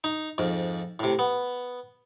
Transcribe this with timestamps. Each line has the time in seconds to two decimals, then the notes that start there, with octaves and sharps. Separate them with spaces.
0.04 D#4
0.38 F2 G#2
0.99 A2 C3
1.19 B3